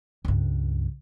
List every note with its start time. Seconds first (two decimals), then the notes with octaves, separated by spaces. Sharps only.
0.25 C#2 G2